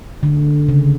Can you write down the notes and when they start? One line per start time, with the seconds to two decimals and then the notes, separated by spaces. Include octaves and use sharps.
0.23 D3
0.69 C#3